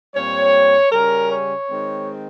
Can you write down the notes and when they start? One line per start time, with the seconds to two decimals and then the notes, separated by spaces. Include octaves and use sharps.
0.15 A#2 G3 C4 C#5
0.92 C#3 G3 C#4 A#4
1.31 C#5
1.69 D#3 G#3 C4